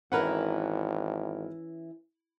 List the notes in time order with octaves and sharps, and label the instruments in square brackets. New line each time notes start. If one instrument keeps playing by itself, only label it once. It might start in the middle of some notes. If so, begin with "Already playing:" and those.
[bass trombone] G#1 [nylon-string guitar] E3 C#4 [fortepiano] A#4 B4 F#5